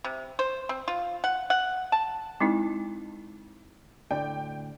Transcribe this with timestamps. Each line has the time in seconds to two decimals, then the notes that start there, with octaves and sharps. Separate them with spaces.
0.04 C3
0.39 C5
0.69 C4
0.88 F4
1.24 F#5
1.50 F#5
1.92 A5
2.41 G#3 C4 D#4 E4
4.11 D2 A2 D3 D5 G5